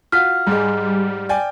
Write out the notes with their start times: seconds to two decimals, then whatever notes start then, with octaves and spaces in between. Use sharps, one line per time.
0.12 F4 F#4 F6 B6
0.47 G#2 G3 G#3
1.29 D5 G5 G#5